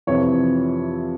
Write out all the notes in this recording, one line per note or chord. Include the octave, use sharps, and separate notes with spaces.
F2 C3 E3 C#5